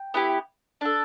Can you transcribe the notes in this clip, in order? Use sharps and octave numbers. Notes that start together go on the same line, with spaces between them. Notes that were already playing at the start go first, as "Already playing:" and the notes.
Already playing: G5
B3 E4 G4
D4 A4